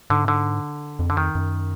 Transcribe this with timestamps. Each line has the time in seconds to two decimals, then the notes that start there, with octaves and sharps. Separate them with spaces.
0.10 G#2 D3
0.28 D3
0.99 F2
1.10 F#2 D3
1.17 F2 D#3
1.35 F#2